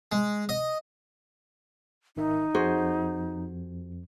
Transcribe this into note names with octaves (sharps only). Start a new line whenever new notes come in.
G#3
D#5
G#1 D#3 D#4 E5
F2 F3 F#4 G#4 C5